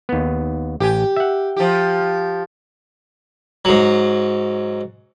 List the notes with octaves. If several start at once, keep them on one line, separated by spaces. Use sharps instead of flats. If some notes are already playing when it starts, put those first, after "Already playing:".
D#2 B3
A1 G4 G#5
E5 F#5
F3 G4
G#2 F#3